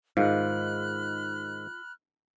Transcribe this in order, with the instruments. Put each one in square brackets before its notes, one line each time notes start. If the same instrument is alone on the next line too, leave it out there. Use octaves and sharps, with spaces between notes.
[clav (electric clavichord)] G#2 D#3 [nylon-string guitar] F4 [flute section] B5 F6 F#6